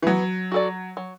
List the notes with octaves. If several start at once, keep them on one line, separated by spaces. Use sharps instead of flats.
E3
F#3 B3
F#4 A4 D5
F#3